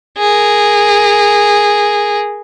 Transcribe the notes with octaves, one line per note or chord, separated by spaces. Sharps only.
G#4 A#4